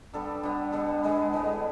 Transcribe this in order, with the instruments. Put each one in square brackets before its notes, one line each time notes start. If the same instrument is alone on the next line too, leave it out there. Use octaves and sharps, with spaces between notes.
[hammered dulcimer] D3 G3 B3 A4
D3 G3 B3
D3 G3 B3 A4
D3 G3 B3
A2 G3 B3 B4